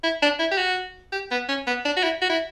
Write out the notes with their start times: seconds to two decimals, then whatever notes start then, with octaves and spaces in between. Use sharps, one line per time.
0.04 E4
0.22 D4
0.39 E4
0.51 G4
0.58 F#4
1.12 G4
1.31 B3
1.49 C#4
1.67 B3
1.85 D4
1.97 F#4
2.04 E4
2.22 F#4
2.30 E4